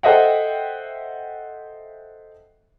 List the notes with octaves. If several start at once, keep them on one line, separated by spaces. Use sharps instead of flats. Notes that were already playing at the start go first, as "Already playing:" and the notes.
A4 C5 D#5 E5 F#5 G5